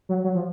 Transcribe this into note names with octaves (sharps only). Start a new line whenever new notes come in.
F#3
F#3
F3